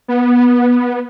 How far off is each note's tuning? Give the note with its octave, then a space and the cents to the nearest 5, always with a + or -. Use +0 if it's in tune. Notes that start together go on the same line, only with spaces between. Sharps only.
B3 -15